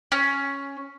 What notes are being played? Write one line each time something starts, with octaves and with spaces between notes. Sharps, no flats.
C#4